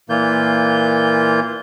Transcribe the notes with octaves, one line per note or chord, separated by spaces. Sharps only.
A#2 E3 A#3 F4 G6